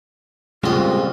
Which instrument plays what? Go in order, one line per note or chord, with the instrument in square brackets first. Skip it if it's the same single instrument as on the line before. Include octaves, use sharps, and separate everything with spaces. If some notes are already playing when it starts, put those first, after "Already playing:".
[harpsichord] A#1 F2 D#5 [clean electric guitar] C#3 G3 G#3 [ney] F4